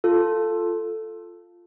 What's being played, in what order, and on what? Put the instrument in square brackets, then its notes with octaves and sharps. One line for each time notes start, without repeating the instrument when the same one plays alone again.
[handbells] F4 A4